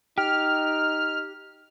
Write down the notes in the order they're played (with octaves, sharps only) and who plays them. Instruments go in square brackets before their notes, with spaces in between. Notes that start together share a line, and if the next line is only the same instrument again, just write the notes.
[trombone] D#4 [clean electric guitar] G4 [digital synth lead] F6